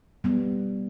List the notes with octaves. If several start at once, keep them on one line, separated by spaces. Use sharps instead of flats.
G3 B3